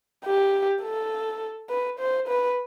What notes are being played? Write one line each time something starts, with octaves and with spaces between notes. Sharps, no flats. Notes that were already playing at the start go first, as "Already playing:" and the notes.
G4
A4
B4
C5
B4